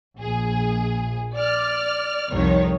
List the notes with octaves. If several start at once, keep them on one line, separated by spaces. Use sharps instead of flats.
A#1 G#4
D5 F6
C2 F2 D#3 C#5